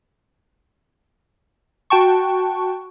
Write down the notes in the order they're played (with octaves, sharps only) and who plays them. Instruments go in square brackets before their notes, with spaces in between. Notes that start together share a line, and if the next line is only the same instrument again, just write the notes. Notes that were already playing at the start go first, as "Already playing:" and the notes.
[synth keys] F#4 G5 A5 C#6